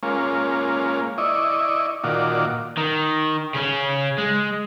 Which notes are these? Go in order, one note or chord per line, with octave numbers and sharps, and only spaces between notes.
G#3 A#3 C#4 F4
E4 D5 D#5 C#6
A#2 D#3 F4 F#4 D5
D#3
C#3 C#4
G#3